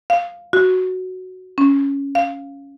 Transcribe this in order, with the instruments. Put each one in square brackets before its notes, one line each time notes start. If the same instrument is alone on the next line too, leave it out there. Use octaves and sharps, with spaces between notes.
[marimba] F5
F#4
C#4
F5